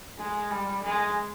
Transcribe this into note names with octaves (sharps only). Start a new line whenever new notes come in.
G#3
G3
G#3